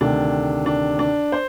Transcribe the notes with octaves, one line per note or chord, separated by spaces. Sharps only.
D2 C3 D#3 D4
D4
D4
C5